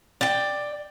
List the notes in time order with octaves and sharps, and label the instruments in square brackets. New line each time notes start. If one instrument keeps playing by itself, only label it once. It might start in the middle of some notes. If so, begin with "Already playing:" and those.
[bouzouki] D5 G5